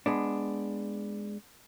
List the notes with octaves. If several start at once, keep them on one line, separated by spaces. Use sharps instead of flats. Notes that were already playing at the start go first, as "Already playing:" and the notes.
G#3 B3 D4